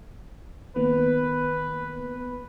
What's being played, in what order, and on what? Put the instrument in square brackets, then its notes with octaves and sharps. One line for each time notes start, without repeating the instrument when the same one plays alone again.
[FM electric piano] D#3 A#3 B3 [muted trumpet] B4